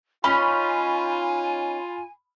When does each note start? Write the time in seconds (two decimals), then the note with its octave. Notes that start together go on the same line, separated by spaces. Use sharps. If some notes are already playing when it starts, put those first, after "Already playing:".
0.24 C#4 D#4 F4 G#5 B5